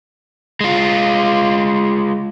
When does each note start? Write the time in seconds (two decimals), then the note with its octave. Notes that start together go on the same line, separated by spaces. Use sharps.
0.61 G#3 F4